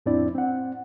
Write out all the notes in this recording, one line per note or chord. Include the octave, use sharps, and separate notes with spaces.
F2 A2 C4 D4 E4 D5
C4 F#5